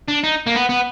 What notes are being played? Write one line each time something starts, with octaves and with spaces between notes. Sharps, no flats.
D4
D#4
A#3
B3
B3